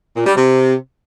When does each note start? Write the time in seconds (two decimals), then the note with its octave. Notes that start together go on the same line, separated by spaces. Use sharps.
0.16 A#2
0.26 G3
0.35 C3